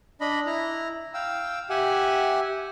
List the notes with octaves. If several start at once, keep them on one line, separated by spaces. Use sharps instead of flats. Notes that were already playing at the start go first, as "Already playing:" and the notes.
D4 D#5 B5
E4 A#5
F5 G5 E6
G4 E5 F#5 G#5